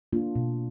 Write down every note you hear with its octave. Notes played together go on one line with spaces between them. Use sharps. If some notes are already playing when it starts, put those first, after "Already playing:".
A#3 D4 F4
B2